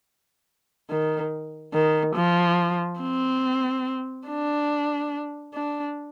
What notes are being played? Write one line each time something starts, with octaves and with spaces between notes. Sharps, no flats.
D#3
D#3
F3
C4
D4
D4